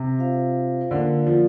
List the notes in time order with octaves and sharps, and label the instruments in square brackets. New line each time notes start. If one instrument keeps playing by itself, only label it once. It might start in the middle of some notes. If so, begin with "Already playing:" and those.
Already playing: [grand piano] C3
[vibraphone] F4 C5 F5
[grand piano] D3 [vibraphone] A#3 F4 A#4 D5 F5
[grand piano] F3